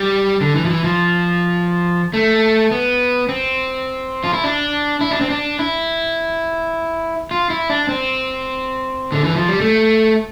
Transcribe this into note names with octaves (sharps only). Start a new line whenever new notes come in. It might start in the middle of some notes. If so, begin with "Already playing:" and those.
Already playing: G3
D3
E3
F3
E3
F3
A3
B3
C4
F4
E4
D4
E4
D4
C4
D4
E4
F4
E4
D4
C4
D3
E3
F3
G3
A3